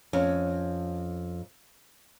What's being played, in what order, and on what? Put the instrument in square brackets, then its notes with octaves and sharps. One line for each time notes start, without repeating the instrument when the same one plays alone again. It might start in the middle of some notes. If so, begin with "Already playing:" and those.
[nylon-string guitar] F2 C#4